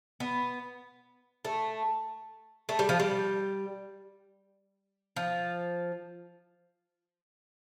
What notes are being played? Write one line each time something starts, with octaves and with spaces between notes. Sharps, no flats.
B3
A3
A3
G3
F3
G3
F3